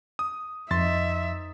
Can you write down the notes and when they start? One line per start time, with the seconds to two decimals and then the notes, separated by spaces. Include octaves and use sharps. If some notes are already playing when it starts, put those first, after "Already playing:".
0.19 D#6
0.71 F2 D#4 A#4 C5 E5 C6 A6